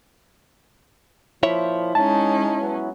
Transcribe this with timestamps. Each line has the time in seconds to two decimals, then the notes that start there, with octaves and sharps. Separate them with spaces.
1.43 A#2 F3 E4 C#5 E5
1.95 G#3 C#4 D#4 A5
2.60 F#3 B3